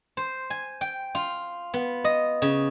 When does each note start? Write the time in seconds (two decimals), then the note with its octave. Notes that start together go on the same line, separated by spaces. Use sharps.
0.17 C5
0.50 G#5
0.81 G5
1.15 F4
1.74 B3
2.04 D#5
2.42 C#3